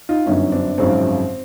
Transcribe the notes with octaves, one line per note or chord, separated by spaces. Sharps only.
D#4 F4
G1 F#2 D3 C#4 D#4
C4 D4
G#1 F#2 C#3 F3 C4